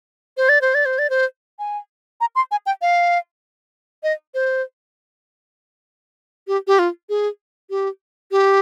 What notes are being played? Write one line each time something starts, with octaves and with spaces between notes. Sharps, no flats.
C5
D5
C5
D5
C5
D5
C5
G#5
A#5
C6
G#5
G5
F5
D#5
C5
G4
G4
F4
G#4
G4
G4